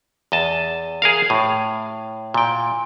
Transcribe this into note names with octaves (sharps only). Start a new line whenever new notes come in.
E2 D#5 A5
G#4 A#4 F5
A2
A#2 G5